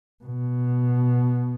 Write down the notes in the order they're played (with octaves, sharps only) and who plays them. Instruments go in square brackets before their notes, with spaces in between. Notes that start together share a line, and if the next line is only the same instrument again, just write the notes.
[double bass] B2